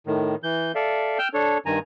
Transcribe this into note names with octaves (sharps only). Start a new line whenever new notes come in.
A2 D#3
E3 G6
A4 D5 E5 F5
G5 E6 F6 G6
D4 A4 C#5
G2 D#3 G#5 A#5